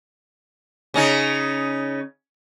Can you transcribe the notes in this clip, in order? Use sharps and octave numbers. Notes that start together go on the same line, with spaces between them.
C#3 C#4 D#4